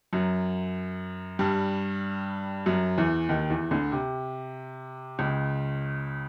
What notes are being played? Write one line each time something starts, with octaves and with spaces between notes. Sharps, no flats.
F#2 F#3
G2 G3
F#2 F#3
E2 E3
D#2 D#3
E2 E3
D2 D3
C3
C#2 C#3